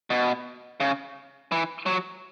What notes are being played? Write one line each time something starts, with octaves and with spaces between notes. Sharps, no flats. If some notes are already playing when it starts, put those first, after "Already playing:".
B2
C#3
E3
F#3